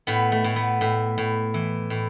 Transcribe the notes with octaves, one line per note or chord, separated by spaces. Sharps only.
A2 B3
A3
A2
B3
A2
A2
E3
A2